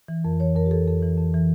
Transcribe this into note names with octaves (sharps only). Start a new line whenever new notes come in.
E3
F2 A#4
E3 C#5
F2 A#4
G4
E3 A4
F2 A4
E3
F2
E3